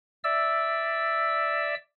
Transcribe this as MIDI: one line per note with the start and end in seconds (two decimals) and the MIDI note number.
0.24 1.75 74
0.24 1.75 76
0.24 1.75 88